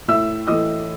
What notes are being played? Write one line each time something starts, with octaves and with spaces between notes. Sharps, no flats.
A2 E5 E6
E3 A3 D#5 D#6